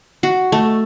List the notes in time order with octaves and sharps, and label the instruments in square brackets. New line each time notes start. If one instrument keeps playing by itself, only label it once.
[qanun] F#4
A3